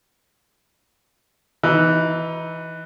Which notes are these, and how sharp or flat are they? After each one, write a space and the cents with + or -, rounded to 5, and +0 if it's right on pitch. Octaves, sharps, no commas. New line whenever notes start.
E3 +0 D#4 +20